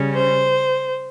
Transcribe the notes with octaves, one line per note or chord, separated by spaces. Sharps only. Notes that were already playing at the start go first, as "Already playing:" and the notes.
Already playing: C#3 G3 C#4
C5